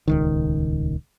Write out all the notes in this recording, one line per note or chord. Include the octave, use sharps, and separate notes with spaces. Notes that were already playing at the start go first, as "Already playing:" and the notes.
D#1 C#2 D#3